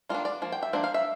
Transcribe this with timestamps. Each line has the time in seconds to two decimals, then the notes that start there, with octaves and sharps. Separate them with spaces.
0.09 G3 A#3 D4 F4
0.25 D5
0.42 F3 A#3
0.52 G5
0.63 E5
0.73 F3 A#3 D4 C5
0.84 F5
0.94 E5